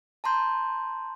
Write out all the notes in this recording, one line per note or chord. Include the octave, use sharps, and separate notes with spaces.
A5 A#5 C6 G6